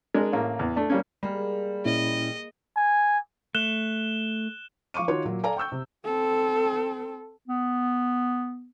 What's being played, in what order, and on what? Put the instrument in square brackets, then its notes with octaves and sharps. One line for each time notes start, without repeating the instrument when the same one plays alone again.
[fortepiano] G#3 D4 A#4 D5
A1 A#3
E2
A3 D4
G3 A#3 C#4
[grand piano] G3 [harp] G#3 A#3
[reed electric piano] A#2 C#4 E4 [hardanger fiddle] D#5
[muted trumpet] G#5
[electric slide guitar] A3 [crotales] F#6 E7 G7
[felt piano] F3 F5 C#6 D6 D#7
D#3 F4 F#4 C#5
A#2 F#3
A4 D5 F5 G#5 A#5
G5 C#6 E6 G6
C3
[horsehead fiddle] C4 A4
[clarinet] B3